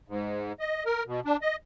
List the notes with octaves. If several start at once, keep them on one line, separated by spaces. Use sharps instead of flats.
G#2
D#5
A#4
B2
D4
D#5